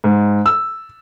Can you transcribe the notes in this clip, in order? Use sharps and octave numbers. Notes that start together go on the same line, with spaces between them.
G#2
E6